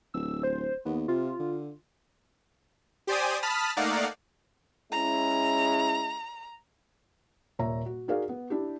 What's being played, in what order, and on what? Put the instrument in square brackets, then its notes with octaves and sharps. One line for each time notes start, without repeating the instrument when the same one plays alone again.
[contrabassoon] D1 [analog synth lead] E6
[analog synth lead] C5
[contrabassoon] D#2 [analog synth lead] B3
[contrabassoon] C3 [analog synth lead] F4
[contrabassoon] D3
[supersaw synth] G4 C5 D5 G#5 D#6
A5 B5 D#6 F6 B6
A3 A#3 D#4 D5 F5 F#5
[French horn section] G#3 C#4 E4 [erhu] A#5
[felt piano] D#1 A#2 C#5 E5 A#5
F#4
D#4 F#4 G#4 A#4 D5 F5
B3
D4 E4 G4